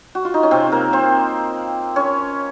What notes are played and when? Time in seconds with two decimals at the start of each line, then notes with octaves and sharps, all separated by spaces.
0.15 F#4
0.25 F4
0.34 D#4
0.43 C#4
0.51 C3 C4
0.72 A#3 A#4
0.93 C4 C5
1.96 C#4 C#5